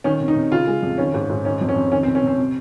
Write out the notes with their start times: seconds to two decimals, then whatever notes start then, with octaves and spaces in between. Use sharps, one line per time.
0.04 D#3 C#4
0.20 C3
0.28 D#4
0.36 C3
0.52 C#3 F4
0.67 G#3
0.83 F2
0.98 D#3 C#4
1.14 G#2
1.30 G#2
1.45 D#3 C#4
1.61 F2
1.69 C#4
1.76 F2
1.92 D#3 C#4
2.03 C4
2.07 C3
2.15 C#4
2.23 C3 C4
2.38 C3